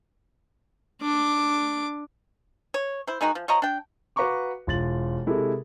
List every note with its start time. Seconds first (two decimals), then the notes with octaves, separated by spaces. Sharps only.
1.02 D4 D6
2.74 C#5
3.07 E4 C5
3.21 D#3 G#3 D#4 F#4
3.35 F3
3.48 F3 C#5 D#5 A#5
3.62 D4 G5
4.16 F#4 B4 F5 A#5 C#6 D6
4.67 E1 F4 A6 F#7
5.27 C3 G#3 E4 G4 A4 A#4